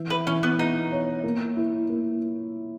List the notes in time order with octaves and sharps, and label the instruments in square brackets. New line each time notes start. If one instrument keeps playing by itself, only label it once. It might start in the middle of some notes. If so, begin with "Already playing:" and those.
Already playing: [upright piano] E3 E5
[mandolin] B4
[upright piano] E3 [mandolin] C#4
[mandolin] B3
[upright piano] B3 [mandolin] D#4
[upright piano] C#5
A#3
E4
A#3